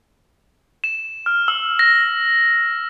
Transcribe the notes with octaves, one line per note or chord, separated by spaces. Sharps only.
E7
F6
E6
A#6